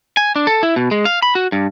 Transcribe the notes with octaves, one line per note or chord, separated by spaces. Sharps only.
G#5
D4
A4
E4
B2
G#3
F5
B5
F#4
G2